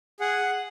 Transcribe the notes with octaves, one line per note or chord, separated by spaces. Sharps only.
G#4 F#5